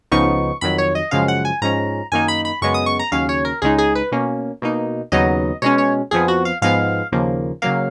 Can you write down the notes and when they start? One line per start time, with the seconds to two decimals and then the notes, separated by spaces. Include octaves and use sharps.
0.11 C#2 C#3 F3 B3 D#4 C#6
0.61 F2 D#3 F#3 B5
0.78 C#5
0.95 D#5
1.11 F#2 C#3 F3 G#3 F5
1.28 F#5
1.45 G#5
1.62 G#2 F3 G#3 C#4 A#5
2.12 F#2 D#3 A#3 D#4 G#5
2.28 B5
2.45 B5
2.61 F#2 C#3 G#3 B3 C#6
2.74 D#6
2.86 C#6
2.99 A#5
3.12 D#2 C#3 F#3 C#4 F5
3.29 C#5
3.45 A#4
3.62 C#2 C#3 G#3 D#4 G#4
3.78 G#4
3.95 B4
4.12 B2 A#3 C#4
4.62 B2 A#3 D#4
5.12 D#2 C#3 F#3 B3 D#4 D#5
5.62 B2 G#3 C#4 C#5
5.78 C#5
6.11 F2 F3 B3 G#4
6.28 F#4
6.45 F5
6.62 G#2 F3 G#3 B3 F5
7.12 D#2 C#3 F3 A#3
7.62 C#3 F#3 A#3 F5